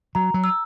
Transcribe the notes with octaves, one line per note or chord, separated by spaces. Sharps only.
F#3 A#5
F#3
E6